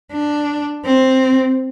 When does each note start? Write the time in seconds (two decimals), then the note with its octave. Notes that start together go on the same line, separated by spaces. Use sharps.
0.12 D4
0.85 C4